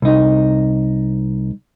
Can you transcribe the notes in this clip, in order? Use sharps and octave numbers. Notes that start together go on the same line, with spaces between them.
C2 D#4